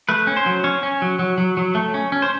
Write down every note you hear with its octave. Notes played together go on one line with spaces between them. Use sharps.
A3 B4
C#4
C5
F#3
C#4 C#5
C#4
F#3
F#3
F#3
F#3
A3
C#4
C#4
C5